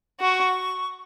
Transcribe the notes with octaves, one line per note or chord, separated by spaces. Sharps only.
F#4 C#6